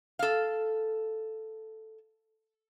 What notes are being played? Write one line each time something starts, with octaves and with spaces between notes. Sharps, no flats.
A4 F5